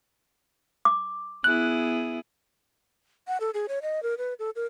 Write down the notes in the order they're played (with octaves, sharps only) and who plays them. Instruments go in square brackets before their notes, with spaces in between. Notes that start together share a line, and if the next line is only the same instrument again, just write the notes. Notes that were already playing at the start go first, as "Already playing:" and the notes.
[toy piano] D6
[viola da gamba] B3 E4 G#4 [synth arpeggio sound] F#6
[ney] F#5
A4
G#4
C#5
D#5
A#4
B4
A4
A#4